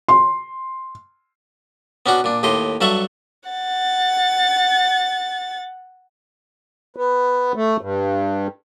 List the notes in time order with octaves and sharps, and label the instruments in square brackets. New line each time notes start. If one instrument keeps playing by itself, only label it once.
[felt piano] C6
[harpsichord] B3 C#4 D4 F#4 F#5
A#2 D4
D#2 A2 G4 D#5 C6
G2 F#3 A4 E5 F#5 C#6
[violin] F#5 A6
[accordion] B3
A3
G2